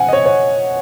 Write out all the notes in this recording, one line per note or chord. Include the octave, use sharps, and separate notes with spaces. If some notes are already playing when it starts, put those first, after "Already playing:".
Already playing: F#5 G#5
D#5
C#5
C#5